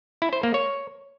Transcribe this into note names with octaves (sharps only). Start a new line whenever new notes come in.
E4
C5
A#3
C#5